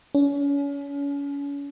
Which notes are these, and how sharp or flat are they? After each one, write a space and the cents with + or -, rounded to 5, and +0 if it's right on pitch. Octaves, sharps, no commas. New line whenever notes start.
C#4 +35